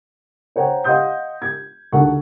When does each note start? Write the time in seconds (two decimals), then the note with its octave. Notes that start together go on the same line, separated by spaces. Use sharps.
0.56 C5 C#5 F#5 G5 A#5
0.84 D#5 F5 F#5 C6 D#6 G6
1.42 G#6
1.92 D2 D#4 A4 F#5 C#6